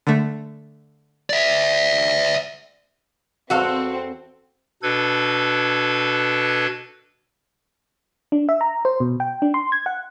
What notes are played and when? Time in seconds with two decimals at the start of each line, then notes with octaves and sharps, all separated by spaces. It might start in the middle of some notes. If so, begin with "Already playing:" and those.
0.07 D3 A3
1.30 D5 E5
3.50 E2 C4 F#4 A4 F5
4.83 B2 D4 A4 B4 G#6
8.32 D4
8.49 E5
8.61 A#5
8.85 C5
9.00 B2
9.20 G5
9.42 D4
9.54 C6
9.72 G#6
9.86 F#5